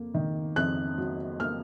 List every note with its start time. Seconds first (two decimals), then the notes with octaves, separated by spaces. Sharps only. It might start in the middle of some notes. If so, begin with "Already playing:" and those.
Already playing: F2 A#3
0.15 D#3
0.56 F2 F#6
0.98 F#3
1.40 A#3 F6